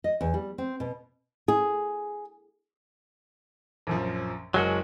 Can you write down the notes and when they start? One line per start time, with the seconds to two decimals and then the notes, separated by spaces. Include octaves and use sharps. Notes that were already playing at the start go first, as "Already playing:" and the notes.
0.04 D#5
0.21 E2
0.34 G3
0.58 C4
0.80 B2
1.48 G#4
3.87 A#1 F#2 F3
4.54 F#1 F#3 G#3 F#4 F6